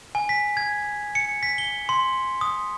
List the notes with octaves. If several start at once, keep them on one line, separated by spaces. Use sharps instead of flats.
G#5
B6
G#6
C#7
B6
G7
C6
D#6